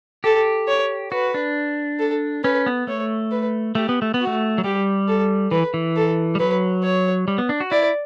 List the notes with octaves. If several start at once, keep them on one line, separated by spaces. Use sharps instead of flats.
G4 A4
C#5
F#4 B4
D4
A4
C#4 B4
B3
A3 C#5
B4
A3 G4
B3
A3
B3
F#4
A3
F#3
G3 G4
A4
E3 B4
E3
A4
G3
F#3 B4
C#5
G3
B3
D4
F#4
E4 D5